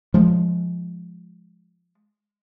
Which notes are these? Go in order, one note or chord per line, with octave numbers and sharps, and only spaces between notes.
F3 G#3